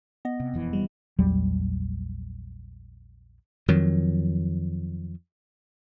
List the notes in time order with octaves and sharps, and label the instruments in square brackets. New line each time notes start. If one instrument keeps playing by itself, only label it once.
[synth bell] B3 D#5
[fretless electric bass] C3
E1 F2 E3
[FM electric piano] G3
[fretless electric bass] A#1 E2 F#3 G3
[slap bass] F2 D#3 F#3